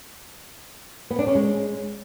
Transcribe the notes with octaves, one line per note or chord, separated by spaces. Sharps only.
B3
D4
C#4
G#3